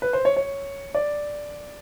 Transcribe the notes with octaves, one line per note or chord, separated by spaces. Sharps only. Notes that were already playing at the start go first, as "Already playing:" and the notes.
B4
C5
C#5
C#5
D5